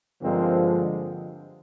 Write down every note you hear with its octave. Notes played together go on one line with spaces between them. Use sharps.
G2 D3 F3 G#3 A#3 C4